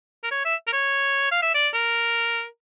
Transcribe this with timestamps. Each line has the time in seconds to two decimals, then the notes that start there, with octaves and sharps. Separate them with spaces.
0.24 A#4
0.31 C#5
0.45 E5
0.67 A#4
0.73 C#5
1.31 F5
1.43 E5
1.54 D5
1.74 A#4